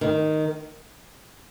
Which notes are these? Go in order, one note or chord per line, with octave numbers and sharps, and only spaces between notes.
D#3